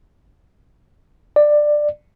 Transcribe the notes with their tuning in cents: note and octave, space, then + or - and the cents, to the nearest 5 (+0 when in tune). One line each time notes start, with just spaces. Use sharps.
D5 +15